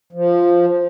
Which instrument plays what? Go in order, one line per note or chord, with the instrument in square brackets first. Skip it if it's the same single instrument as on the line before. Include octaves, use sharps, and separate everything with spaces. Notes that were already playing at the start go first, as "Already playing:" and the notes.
[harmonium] F3